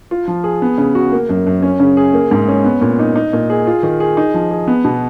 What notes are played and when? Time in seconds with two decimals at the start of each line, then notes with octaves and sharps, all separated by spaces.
0.11 F4
0.28 F3
0.44 G#4
0.62 B3
0.78 C#3
0.95 F#4
1.12 A#3
1.29 F#2
1.47 F#2
1.62 C#4
1.80 C#3
1.97 G#4
2.13 A#3
2.31 G#2
2.48 C#4
2.64 B3
2.82 A#2
2.99 D#4
3.16 D#4
3.33 A#2
3.50 G#4
3.67 F4
3.83 D#3
4.00 G#4
4.17 D#4
4.34 F3
4.51 G#4
4.68 B3
4.84 B2